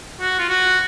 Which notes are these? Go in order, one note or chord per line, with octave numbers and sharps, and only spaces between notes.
F#4
F4
F#4